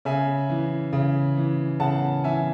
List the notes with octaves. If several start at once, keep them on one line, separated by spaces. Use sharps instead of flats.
C#3 E5 G#5
E3
C#3
E3
C#3 F#5 A5
E3 E5 G#5